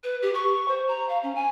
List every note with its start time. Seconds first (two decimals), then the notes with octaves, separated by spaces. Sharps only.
0.04 B4
0.22 G4
0.34 C#6
0.68 C5
0.88 A#5
1.09 F5
1.23 C#4
1.35 G#5